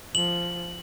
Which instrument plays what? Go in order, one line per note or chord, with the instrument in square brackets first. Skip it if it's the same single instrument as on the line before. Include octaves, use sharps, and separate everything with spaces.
[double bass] F3 [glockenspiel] F#7